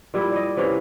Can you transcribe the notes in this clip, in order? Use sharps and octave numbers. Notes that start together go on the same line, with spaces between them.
A#2 G3 E4
D5 D#5
C3 E3 A#3 C#4